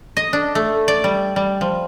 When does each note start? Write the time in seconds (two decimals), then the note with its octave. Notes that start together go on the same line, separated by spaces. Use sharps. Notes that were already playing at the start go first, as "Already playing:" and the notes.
0.17 D#5
0.33 D4
0.55 A3
0.88 D5
1.04 G3
1.36 G3
1.61 F3